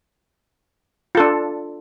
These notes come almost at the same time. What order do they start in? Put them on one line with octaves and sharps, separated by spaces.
F4 A4 D4